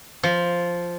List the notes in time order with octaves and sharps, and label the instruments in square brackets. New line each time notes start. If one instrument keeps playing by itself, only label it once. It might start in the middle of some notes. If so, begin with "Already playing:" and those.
[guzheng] F3